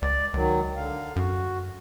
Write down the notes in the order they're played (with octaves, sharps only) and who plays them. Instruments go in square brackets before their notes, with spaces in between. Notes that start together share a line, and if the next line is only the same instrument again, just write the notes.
[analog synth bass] C#2 [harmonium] D5
[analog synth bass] C#2 [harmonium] D#3 F#3
[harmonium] D3 F5
[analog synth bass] F#2 [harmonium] F#4